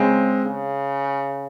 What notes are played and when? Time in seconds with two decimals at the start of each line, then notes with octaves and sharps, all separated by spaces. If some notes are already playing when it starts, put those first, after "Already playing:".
Already playing: C#3 G#3 C4
0.45 C#3